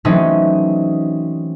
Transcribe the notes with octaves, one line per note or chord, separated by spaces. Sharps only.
E3 F#3 A3 C4 C#4 D#4